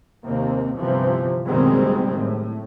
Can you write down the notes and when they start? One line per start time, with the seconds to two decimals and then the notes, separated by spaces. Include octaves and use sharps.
0.24 D#2 C3 A#3 C4
0.76 G1 C3 E3 F3
1.48 F#1 B2 D#3 G3 G#3 C4
2.15 A2